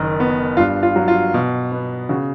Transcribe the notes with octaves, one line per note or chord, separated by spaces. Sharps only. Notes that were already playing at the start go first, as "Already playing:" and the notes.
Already playing: F#1 D#3
B3
G2 F4
F4
F#3
F4
B2
B3
C#3 F#4